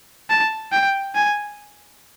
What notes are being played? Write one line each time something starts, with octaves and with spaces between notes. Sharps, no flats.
A5
G5
G#5